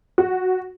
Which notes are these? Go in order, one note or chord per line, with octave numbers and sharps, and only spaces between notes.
F#4